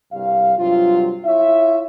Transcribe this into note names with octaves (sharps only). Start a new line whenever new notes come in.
C2 G2 G3 F5
G2 C3 F#3 F4
E4 F4 C#5 E5